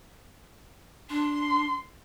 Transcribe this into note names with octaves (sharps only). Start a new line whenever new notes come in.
D4 C6